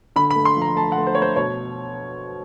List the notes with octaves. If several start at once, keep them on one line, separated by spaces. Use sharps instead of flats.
D3 B5
B5
A3
C6
F3 A#5
A3 A5
F#5
A3
C5
C#5
A3 C5
B2 C#5